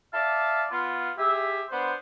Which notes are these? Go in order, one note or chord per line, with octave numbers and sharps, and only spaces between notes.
D5 E5 F5 A5
B3 F4
G4 G#4 E5
B3 D4 C5